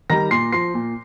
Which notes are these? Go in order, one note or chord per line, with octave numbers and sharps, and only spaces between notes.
D#3 G3 A#5 A#6
A#2 C6 C7
F3 C6 C7
A#2